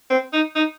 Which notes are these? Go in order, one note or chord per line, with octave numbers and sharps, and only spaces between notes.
C4
D#4
D#4